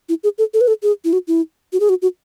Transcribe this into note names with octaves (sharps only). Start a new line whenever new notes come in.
E4
G#4
A4
A4
B4
A4
G#4
E4
F#4
E4
F#4
G#4
F#4
F#4